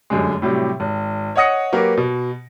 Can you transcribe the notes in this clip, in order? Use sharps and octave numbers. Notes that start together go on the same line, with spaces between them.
F1 F#2 D3 G#3
A2 C3 F#3 G3
G#1
C#5 D#5 F#5 D#6 A#6 C#7
F#3 A#3 F#4 G4 A#4 B4
B2